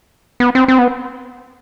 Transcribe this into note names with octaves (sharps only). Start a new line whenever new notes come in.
B3
C4
C4
B3